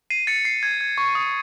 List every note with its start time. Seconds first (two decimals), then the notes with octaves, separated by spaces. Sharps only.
0.10 C7 D#7
0.27 A6 C#7
0.45 C7
0.63 G#6
0.81 G#6
0.98 C#6
1.15 D#6